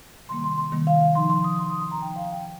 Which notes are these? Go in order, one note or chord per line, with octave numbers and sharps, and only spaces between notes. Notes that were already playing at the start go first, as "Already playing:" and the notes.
C3 D#3 G3 A#3 C6
C6
C6
C3 D#3 G3 A#3
F5
F5
F3 D#4 C6
C6
D#6
F3 D#4 C6
D#6
C6
A#5
F3 D#4 G5
F5
G5